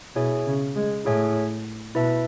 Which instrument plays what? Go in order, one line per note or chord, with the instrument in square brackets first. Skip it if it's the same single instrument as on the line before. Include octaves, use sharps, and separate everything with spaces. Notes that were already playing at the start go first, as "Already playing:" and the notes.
[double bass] B2 [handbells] E4 G#4 C#5 E5 G#5
[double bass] C#3
G#3
[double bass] A2 [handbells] E4 G#4 C#5 E5 G#5
[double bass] B2 [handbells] E4 B4 E5 A5